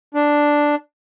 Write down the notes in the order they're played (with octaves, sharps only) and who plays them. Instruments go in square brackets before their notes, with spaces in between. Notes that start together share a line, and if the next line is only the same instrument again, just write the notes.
[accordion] D4